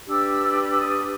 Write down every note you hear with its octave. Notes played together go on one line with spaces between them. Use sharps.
D4 G4 B4 E6
E6
D#6